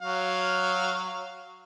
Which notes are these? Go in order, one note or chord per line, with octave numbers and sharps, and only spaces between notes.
F#3 F5